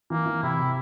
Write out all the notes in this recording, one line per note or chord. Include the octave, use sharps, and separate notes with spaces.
E3 A#3
E3
C3 E4
C3